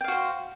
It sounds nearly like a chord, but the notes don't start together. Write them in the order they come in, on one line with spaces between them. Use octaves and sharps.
G5 F5 F#4 C5